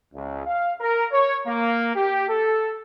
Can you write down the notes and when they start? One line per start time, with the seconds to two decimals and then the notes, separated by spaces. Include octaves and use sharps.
0.14 C#2
0.46 F5
0.81 A#4
1.12 C#5
1.47 A#3
1.96 G4
2.29 A4